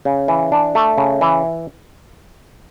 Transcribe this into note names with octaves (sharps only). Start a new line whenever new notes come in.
C#3
E3
D4
A3
C#3
E3